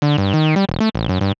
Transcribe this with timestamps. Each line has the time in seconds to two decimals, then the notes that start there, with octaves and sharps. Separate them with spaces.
0.02 D3
0.18 G2
0.34 D#3
0.56 G3
0.69 E1
0.80 A3
0.95 A1
1.09 F#2
1.21 G2